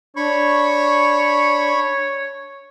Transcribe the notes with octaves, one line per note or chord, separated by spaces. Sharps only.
D4 C#5 B5 C#6